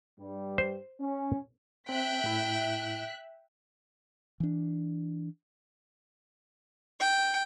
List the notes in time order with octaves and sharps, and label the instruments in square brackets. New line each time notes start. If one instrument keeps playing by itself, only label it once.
[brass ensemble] G2 G3
[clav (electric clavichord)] C5
[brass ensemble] C#4
[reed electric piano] C4 [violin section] E5 F#6 B6 [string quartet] G5
[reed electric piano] A2 E4
[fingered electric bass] E3 D4
[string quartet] G5